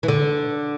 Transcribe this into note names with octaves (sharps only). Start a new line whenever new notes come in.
E3
D3